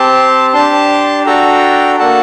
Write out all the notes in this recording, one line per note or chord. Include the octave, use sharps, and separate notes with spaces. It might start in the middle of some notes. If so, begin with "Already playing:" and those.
Already playing: C4 G4 A5 C6
D4 G4 A5 C6
D4 F#4 A4 G5 A#5
A#3 D4 F#4 A4 F#5 A5